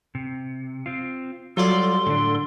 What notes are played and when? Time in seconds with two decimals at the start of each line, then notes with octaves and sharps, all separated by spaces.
0.15 C3
0.86 C4 F4
1.57 F#3 G3 F4 A4 D5 C6
2.07 A2 D3 D4